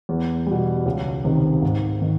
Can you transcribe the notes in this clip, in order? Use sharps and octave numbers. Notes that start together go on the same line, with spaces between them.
E2
B2 G3
C#2
C3 D#3
G#2
D#3